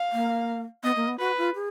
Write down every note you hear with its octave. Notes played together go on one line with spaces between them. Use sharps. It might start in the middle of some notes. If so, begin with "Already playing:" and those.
Already playing: F5
A#3
B3 D#5
A#3
B3
F#4 B4
F4
G#4